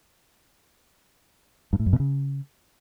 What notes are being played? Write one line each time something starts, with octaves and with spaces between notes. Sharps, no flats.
G2
A2
F#2
B2
C#3